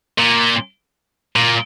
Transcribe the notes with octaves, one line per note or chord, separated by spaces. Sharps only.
A#2
A#2